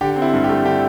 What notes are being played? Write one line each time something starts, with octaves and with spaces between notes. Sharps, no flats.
D3 G4
C4
E4
G2
G4
A3
D3 G4